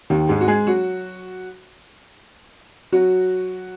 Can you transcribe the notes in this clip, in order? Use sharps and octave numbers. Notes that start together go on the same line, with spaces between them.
D#2 D#3
G#2 G#3
F#4
G#3 G#4
F#3 F#4
F#3 F#4